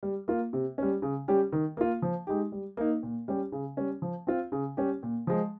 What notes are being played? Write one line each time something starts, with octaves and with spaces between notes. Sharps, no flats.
G3
A#3 F4
C3
G3 C#4
C#3
G3 C#4 G4
D#3
A#3 F4
F3
G#3 D#4 G4
G3
A#3 D#4
A#2
G3 C#4 G4
C#3
G3 C#4
F3
C4 F4
C#3
G3 C#4 G4
A#2
F3 G#3